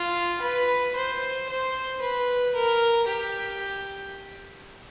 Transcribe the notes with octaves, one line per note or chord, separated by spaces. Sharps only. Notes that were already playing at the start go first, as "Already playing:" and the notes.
Already playing: F4
B4
C5
C5
B4
A#4
G4